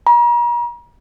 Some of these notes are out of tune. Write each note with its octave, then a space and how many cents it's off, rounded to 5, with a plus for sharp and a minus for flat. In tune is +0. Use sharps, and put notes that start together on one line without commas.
A#5 +40